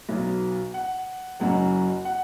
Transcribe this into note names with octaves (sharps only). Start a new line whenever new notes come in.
B1 B2 F#3
F#5
F#1 F#2 F#3 F#5
F#5